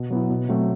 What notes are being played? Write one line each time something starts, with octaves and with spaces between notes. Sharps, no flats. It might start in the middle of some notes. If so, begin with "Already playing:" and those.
Already playing: B2
F#3 B3 E4
B2
F#3 A3 C4